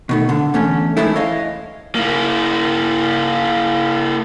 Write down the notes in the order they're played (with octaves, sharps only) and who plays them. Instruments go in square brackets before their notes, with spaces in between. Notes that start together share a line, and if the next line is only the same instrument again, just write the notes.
[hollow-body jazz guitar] B2 D#3 A3
A2 D3
E2 A3 C#4
A2 D#3 E3 G#3 A3 E4
C#5 D#5 F5
[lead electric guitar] A#3 E4